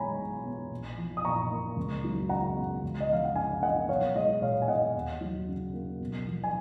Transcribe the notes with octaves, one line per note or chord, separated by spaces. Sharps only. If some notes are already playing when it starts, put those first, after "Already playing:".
Already playing: B1 G#3 C#5 G#5 A#5 B5
B2
B3
A#1
F3
D#6
A#2 A#5 C#6
A#3
C#2
F#3
C#3 F#5 A#5
B3
C#2
D#5
F3 F5
F#5
C#3 F5 G#5
A#3 D#5 F#5
B1 C#5 F5
G#3 D#5
A#2 C#5 F5
G#5
B3 D#5 F#5
D#2
F#3
C#3
A#3
B1
F3
G#5